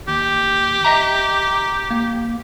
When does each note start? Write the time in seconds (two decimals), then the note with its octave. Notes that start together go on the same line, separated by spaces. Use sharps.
0.08 D#2 G4
0.85 D#5 E5 A#5
1.91 A#3